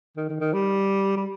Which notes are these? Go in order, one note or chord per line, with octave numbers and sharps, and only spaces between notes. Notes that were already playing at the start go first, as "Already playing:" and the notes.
D#3
D#3
D#3
G3
G3